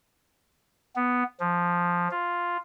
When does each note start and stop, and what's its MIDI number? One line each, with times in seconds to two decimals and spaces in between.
0.96 1.23 59
1.40 2.08 53
2.11 2.57 65